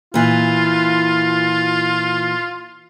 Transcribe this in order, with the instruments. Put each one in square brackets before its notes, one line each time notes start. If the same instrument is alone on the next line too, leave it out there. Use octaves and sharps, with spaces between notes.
[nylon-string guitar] A#2 E3 [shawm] F4